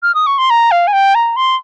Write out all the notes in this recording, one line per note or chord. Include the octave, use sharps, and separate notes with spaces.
F6
D#6
C#6
C6
A#5
F5
G#5
G5
A#5
C6